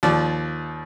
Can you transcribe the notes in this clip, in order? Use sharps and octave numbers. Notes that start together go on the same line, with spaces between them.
D#2 F3 D5